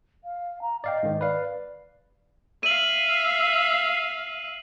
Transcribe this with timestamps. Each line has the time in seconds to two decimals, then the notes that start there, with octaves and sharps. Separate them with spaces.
0.24 F5
0.62 A#5
0.84 D5 D#5 F5 G5
1.03 G#2 D#3
1.21 B4 D5 F5
2.63 E5 F5 D#7 F#7